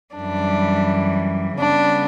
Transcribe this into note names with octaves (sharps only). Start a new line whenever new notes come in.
F#2 E3 G3 D4
C#3 G3 B3 D4